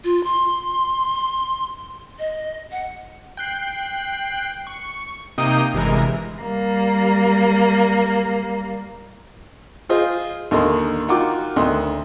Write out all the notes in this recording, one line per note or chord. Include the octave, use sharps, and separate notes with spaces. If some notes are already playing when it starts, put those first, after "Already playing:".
F4
C6
D#5
F#5
G5 F#6 C7
C#6
C3 A#3 D#4 G5 D#6 D#7
G1 C3 E3 G#3 A#4
G3 A#3
F4 G#4 C5 D#5
D#2 D3 A#3 D#5 C6
D#4 F4 F#4 A#4 G5 D6
D2 D#3 D#5 C6